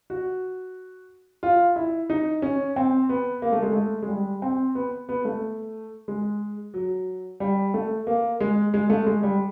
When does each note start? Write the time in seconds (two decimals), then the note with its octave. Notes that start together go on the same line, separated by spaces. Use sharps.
0.10 F#4
1.43 F4
1.76 E4
2.10 D#4
2.42 C#4
2.76 C4
3.09 B3
3.42 A#3
3.52 A3
3.62 G#3
3.72 A3
4.02 G#3
4.08 G3
4.42 C4
4.75 B3
5.09 B3
5.25 A3
6.08 G#3
6.74 F#3
7.40 G3
7.74 A3
8.07 A#3
8.40 G#3
8.74 G#3
8.90 A3
9.07 G#3
9.23 G3